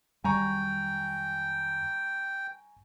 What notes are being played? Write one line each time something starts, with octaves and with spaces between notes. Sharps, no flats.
F2 D#3 F#3 G3 G5 G#5 A#5 C#6